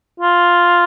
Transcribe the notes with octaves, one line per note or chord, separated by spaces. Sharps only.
F4